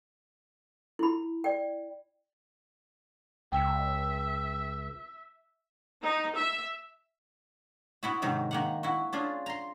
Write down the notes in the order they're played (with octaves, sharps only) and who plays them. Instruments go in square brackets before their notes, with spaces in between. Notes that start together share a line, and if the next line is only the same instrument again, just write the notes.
[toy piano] E4 B5
D5 G5
[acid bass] C#2 [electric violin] E5 [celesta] G5
[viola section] D#4
E5
[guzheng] B3 E4 F#4
G#2 C3 D#3 F#3
D#3 A#3 F#5
E4 F#4
C#4 D4 F4 G#4
A#5 C6